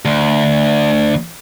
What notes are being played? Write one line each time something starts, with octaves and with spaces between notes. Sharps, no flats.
D2